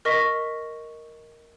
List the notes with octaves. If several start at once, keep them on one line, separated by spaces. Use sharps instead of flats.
A#4 D#5 C#6 A#6 B6